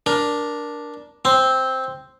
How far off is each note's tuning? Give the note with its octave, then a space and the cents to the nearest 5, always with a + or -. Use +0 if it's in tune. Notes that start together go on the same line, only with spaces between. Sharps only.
D4 +0 A#4 +15
C4 +0 C6 +0